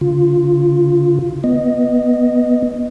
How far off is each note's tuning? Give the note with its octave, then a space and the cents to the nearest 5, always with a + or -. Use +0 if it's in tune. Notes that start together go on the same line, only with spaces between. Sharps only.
D3 -40 F4 +0
B3 -5 D#5 +0